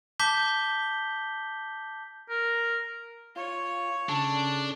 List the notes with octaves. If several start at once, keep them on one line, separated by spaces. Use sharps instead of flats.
A5 D6 G6 B6 G7
A#4
F4 C#5
C#3 D4 A4